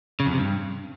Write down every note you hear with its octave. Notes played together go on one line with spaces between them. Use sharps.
C#3
F2
C3
G2